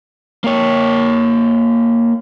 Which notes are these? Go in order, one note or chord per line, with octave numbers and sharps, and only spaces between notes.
A#3 C#5